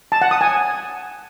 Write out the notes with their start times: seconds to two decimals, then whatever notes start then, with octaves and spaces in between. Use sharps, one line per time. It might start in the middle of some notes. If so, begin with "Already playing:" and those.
0.12 A5
0.22 F#5
0.31 D#6
0.41 G#5